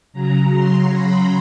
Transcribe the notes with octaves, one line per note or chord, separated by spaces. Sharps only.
C#3 F#3 A#5
C6
B5